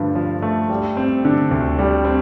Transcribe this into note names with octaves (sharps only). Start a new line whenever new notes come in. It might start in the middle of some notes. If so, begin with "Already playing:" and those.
Already playing: G2 D3 F3 A3
F3
A3
G3
C4
D3
D2
G3
C4